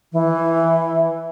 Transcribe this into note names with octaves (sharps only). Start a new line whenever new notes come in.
E3